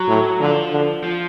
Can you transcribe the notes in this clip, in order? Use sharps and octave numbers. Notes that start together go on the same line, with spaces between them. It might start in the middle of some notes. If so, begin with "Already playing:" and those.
Already playing: F#3
A2
D3 F3
D3
F3